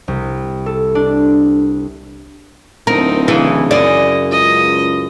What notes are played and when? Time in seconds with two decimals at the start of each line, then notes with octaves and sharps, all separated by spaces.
0.08 C2
0.66 A4
0.95 D4
2.87 D1 C4 D#4 A#4
3.28 C#3 E3
3.71 F#2 E4 D5 D#5
4.31 C#2 D#5